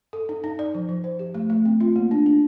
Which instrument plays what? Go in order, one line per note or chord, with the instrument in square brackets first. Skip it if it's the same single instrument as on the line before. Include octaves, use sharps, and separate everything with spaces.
[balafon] A4
D#4
D#4
D5
F3
F3
C5
G4
A3
A3
C4
F4
A#3
D4
D4